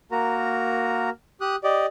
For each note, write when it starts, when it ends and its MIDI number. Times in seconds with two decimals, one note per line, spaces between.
0.11 1.10 58
0.11 1.10 66
0.11 1.10 70
0.11 1.10 82
1.41 1.56 67
1.41 1.56 87
1.41 1.56 90
1.64 1.86 67
1.64 1.86 74
1.64 1.86 75